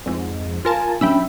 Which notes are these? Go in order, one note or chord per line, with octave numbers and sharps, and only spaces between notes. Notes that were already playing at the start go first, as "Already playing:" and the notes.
F2 G#2
F4 A#4 G#5 A5
F#3 C#4 D4 E5 G5 B5 E6